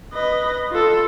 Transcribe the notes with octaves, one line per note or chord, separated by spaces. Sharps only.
B4 D#5
F4 A4